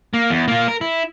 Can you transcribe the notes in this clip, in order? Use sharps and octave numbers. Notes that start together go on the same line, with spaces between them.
A#3
E2
A#3 F4
A#4
E4